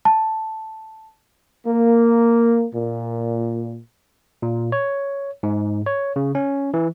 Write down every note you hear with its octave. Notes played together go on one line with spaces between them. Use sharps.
A5
A#3
A#2
A#2
C#5
G#2
C#5
C#3
C#4
E3